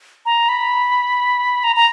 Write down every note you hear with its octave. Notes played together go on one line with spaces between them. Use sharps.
A#5
B5
A#5
A#5